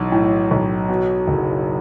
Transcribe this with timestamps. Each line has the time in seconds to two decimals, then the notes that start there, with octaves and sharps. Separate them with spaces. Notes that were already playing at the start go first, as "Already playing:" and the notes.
Already playing: B1 E3
0.12 A2
0.51 B1
0.89 B2
1.27 F#1